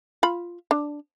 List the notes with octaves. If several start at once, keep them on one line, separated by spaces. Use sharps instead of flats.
F4 B5
D4